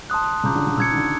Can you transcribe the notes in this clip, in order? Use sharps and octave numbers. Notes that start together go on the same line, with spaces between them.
A5 C6 D#6 F#6
C#3 A#5 D6 G6
D3
D3
C#3 E6 G#6 C#7
D#3
D3